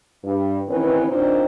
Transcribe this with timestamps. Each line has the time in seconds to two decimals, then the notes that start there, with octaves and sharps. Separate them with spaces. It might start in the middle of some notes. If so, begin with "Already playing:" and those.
0.24 G2
0.67 D#2 D#3 E3 C4 C#4 B4
1.07 A#2 D#3 C4 D4 D#4